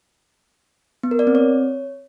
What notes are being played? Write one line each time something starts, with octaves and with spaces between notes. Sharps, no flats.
B3
A#4
D5
C4
C#5